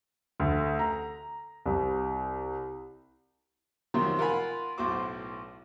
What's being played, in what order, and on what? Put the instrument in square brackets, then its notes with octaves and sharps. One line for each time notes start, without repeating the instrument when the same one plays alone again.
[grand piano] D2
A#5
C2
[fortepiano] C3 D#3 F3 F#3 C4 F4
F4 A#4 F5 F#5 G#5 B5
B1 A2 F#4 C5 D6